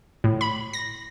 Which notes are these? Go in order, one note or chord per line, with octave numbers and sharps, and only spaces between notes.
A2
B5
A#6